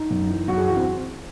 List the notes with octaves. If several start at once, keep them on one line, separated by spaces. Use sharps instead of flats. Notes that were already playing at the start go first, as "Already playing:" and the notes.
Already playing: D#4
F#2
E3
F#2 F#4
G#4
E3 F#4
C4